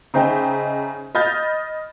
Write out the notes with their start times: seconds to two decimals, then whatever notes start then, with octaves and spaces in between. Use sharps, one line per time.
0.14 C#3 D#4 C5 E5 G5
1.15 D#5 B5 F6 G6 A6